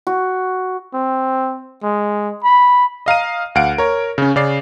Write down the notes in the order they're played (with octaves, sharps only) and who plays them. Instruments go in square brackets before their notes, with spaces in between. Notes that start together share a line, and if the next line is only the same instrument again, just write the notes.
[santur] F#4
[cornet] C4
G#3
B5
[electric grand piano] D#5 F5 A#5 D#7
D2 F5 F#5 D7
A#4 C#5
C#3 C#4
C#3 D5 C7